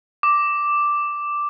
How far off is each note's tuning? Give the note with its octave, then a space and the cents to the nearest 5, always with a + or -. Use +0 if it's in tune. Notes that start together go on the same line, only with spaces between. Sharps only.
D6 +0